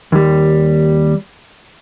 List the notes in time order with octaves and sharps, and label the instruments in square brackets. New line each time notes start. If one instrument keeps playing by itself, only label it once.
[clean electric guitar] D#2 G3